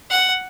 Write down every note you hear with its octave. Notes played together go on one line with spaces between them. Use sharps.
F#5